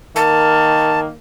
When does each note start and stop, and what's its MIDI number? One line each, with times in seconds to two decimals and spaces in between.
0.16 1.10 51
0.16 1.15 58
0.16 1.00 81